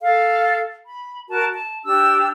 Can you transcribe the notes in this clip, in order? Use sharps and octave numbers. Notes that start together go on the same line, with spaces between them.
A4 F5
B5
F#4 A#4 A5
A5
D4 G4 E6